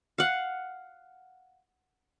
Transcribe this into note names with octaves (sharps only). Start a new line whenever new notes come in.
F5 F#5